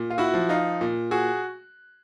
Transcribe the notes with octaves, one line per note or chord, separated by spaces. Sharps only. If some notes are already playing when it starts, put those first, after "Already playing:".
Already playing: A#2
F4
E4 F#4
F3
D#4 F4
A#2
F#4 G#4